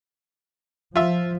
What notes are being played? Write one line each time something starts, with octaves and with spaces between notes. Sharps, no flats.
F3 F4 E5